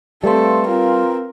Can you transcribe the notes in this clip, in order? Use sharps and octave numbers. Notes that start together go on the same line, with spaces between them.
G3 A3 C4 A4 B4 F5 C6
C4 F4 A#4